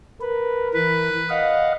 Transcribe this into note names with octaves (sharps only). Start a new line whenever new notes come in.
A#4 B4
E3 B4
D#5 F5 F#5